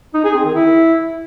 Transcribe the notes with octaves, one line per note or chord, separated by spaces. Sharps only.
D#4
G#4
C4
D#3
E4